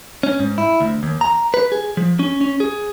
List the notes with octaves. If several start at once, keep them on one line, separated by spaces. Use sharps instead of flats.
C#4
G#2
E4
D2
D#2
A#5
B4
G#4
F3
C#4
C#4
G#4